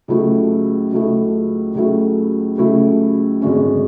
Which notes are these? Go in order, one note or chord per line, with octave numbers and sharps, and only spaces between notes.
C#2 C#3 F#3 A3 E4
C#2 C#3 F#3 A3 E4
C#2 C#3 F#3 A3 E4
C#2 C#3 F#3 A3 E4
G#1 F#2 D3 G#3 C#4